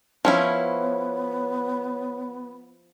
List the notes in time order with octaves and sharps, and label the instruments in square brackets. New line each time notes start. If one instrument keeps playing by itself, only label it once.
[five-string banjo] F3 C#4 E4 [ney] B3 [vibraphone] C#5